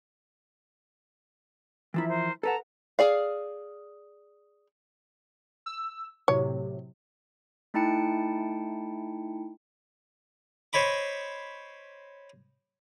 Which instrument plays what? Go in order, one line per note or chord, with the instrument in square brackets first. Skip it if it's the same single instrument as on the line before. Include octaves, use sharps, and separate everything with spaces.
[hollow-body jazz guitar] E3 F3 E4 [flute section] A#4 E5
[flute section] A#4 C5
[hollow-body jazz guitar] A4 B4 F#5 [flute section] A5 A#5
[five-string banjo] G#4 D5 F5
[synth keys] E6
[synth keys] A2 C3 F#3 [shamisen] C#5
[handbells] A3 D#4 E4 G5 A5 C#7
[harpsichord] C5 C#5 D#5 B5 D6